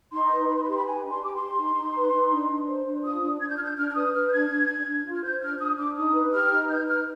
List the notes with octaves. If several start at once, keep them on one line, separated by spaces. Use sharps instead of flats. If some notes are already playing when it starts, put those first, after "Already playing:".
D#4 C6
B4
D#4 B5
C6
B5
G4 C6
B5
B4 G#5
D4
C6
G4 D6
C6
G4
D#4
D#4
B4
D#4
D4
D4
C5
D4
F4 D#6
D4
D4 G#6
G6
F6
D4 G6
D4 F6
F6
B4 D#6
B4 F6
G6
D4 G#6
D4
D4
D4
F4
F6
C5 G6
D4 F6
D4 D#6
D4 D6
D#4 D#6
B4
G4 F6
D#4
B4 G6
D#4 F6